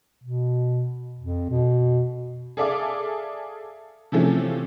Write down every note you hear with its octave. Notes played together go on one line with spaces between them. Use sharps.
B2
F2
B2
G#4 A4 D5 E5 F5 D6
C3 E3 F3 A3 C4 C#4